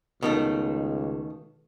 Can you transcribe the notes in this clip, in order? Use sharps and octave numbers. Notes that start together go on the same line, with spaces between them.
C#2 B2 D#3 A3